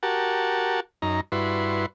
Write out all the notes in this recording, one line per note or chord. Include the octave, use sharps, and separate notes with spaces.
F#4 G4 A#4 F#5 A5
F#2 D#4 A#5
G2 E4 F#4 B4 C6